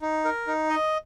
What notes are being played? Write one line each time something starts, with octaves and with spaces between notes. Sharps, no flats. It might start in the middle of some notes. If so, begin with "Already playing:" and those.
D#4
A#4
D#4
D#5